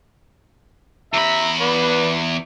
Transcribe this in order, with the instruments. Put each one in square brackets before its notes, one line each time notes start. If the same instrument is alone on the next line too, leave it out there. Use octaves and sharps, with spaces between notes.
[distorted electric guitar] E2 B5 [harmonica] E5 A#5
[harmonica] B3 B4 D5